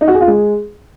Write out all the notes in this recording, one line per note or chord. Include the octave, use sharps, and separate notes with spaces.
D#4
F#4
G#4
F4
G#3